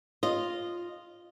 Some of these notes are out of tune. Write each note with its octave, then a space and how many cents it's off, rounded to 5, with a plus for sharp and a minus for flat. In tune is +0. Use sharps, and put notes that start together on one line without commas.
F4 +0 D#5 -10